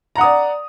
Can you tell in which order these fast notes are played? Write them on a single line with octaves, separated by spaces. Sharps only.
A#5 F#5 D#6 D5